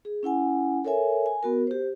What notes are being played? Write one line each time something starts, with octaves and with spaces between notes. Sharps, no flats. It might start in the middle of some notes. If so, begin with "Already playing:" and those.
G#4
C#4 E4 F#5 G#5
A4 A#4 C#5 E5 G#5
G#5
B3 F#4 A#4
G4 C5